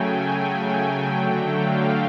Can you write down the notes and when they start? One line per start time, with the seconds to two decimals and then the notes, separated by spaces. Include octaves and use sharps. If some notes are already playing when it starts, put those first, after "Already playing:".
Already playing: C#3 F#3 A3 G5 G#5
0.62 G5
1.07 D3 F#3 A3
1.53 F5